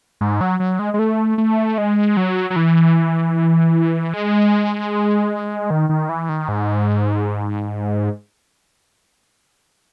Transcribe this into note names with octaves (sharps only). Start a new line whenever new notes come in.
G#2
F#3
F#3
G#3
G#3
A3
A3
G#3
F#3
F#3
E3
G#3
D#3
D#3
E3
D#3
G#2